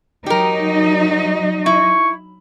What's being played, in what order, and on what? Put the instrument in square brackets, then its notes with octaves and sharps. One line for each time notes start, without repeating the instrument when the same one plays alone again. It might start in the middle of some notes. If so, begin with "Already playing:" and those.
[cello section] F#3 D#4 D#5 [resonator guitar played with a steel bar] G4 A#4
[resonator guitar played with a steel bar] E4 [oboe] C#6